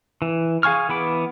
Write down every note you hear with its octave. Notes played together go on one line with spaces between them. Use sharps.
E3
G#4 F5 G#5 C#6 F6
E3 B3 B5 D6